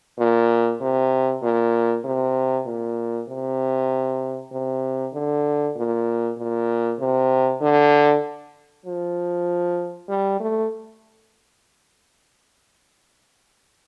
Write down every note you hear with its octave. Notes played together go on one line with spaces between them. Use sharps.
A#2
C3
A#2
C3
A#2
C3
C3
D3
A#2
A#2
C3
D3
F3
G3
A3